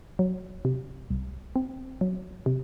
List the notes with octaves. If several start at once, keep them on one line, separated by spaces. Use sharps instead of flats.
F#3
C3
C2
C4
F#3
C3